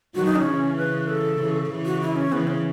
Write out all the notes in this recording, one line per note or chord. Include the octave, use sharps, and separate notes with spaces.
D#3 F#3 F#4
D#4
C#4
C#3 E3
B4
A4
C#3 E3
C#3 E3
F#4
E4
C#4
C#3 E3 B3
C#4